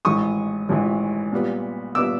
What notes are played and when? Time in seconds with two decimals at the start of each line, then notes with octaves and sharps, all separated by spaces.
0.05 A1 G#2 E3 C#6 D#6
0.69 A1 G#2 E3
1.32 A#2 G3 B3
1.95 A#2 G3 B3 D6 E6